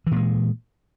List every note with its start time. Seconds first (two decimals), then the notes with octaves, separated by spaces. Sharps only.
0.07 E3
0.11 A#2
0.16 G#3